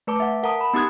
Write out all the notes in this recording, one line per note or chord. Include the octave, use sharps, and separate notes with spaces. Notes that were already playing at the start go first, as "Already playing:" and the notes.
A3 B4 A5 D6
E5 F#5
A#4 F#5 A5 A#5 D#6
B5
B3 D#4 G4 D#6 F#6 G#6